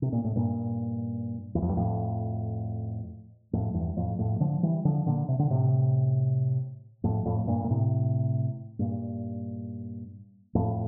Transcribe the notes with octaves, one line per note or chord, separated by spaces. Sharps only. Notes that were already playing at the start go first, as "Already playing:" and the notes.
C3
A#2
A2
G2 A#2
E2
F2
G2
F2 A2
F2 A2
E2 G2
F2 A2
F2 A2
D3 F3
E3 G3
D3 F3
A#2 D3
C3
D3
A2 C3
F2 A2
F2 A2
G2 A#2
A#2
A2 C3
G2 A#2
F2 A2